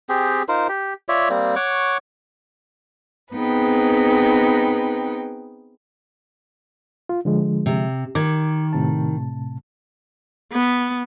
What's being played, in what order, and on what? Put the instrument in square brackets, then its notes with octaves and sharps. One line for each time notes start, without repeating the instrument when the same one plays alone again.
[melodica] C4 G4 G#4
D#4 F4 A#4 C5
G4
F4 C#5 D5 E5
G3 A#3 C4
C#5 F#5 C#6 D6
[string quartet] B3 C4 D#4 G#4 B4 G5
[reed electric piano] F4
D3 F3 G#3
[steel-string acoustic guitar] C3
[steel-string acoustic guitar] D#3 [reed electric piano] D6 G#6
[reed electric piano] A2 C3 A5
[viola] B3